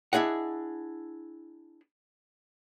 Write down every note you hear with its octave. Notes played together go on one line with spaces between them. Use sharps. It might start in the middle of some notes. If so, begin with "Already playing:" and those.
D4 E4 G#4 D#5 F#5